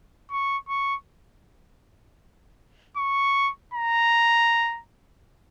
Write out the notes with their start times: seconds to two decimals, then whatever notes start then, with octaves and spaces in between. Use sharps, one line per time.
0.31 C#6
0.68 C#6
2.97 C#6
3.74 A#5